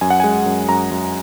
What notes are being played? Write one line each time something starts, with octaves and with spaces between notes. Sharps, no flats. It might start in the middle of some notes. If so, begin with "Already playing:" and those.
F#2 G#5
F#5
G#3 G#5
F#2
F#2 A#5
F#2